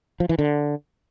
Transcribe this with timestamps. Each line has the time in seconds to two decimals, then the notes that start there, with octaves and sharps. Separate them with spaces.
0.20 F3
0.29 E3
0.39 D3